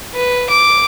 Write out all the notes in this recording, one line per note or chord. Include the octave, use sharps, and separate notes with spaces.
B4
D6